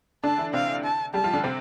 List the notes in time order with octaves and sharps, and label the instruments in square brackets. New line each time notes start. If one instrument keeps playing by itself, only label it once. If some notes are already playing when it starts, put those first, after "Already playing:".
[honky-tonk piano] D3 D4 [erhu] A5
[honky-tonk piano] E3 E4
[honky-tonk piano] C3 C4 [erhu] F5
[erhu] A5
[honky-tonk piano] G3 G4 [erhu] A5
[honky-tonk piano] F3 F4
D3 D4
C3 C4